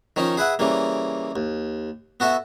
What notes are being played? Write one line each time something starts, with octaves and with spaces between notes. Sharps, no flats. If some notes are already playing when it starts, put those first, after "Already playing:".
D#3 F3 C#4 D#4
G#4 B4 E5 F#5
C#3 E3 G3 A#3
D#2
B3 F#4 A4 E5